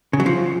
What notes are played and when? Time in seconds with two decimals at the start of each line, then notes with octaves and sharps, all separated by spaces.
0.13 C#3
0.20 F#3
0.26 F3